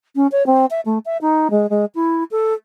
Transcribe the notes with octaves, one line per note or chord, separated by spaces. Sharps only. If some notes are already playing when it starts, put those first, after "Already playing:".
C#4
C#5
C4
E5
A3
E5
D#4
G#3
G#3
E4
A4